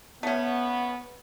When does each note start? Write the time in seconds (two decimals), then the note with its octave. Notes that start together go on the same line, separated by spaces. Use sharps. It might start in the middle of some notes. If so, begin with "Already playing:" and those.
0.23 A3 B3 C#4